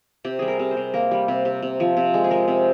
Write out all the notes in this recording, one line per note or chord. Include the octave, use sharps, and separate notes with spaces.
C3 G4
G3 G#4
A#4
C3
C5
C3
A#3 A#4
G3
C3
C3
C3
F3
C3
G#3
G#4
G#3 A#4
C3